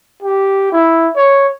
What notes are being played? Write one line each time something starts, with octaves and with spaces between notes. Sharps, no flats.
G4
E4
C#5